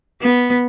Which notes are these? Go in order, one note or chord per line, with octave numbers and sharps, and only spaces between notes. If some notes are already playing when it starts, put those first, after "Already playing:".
B3